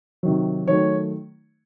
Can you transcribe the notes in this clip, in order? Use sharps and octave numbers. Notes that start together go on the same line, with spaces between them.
C3 D#3 F#3
D#3 F#3 A3 C#5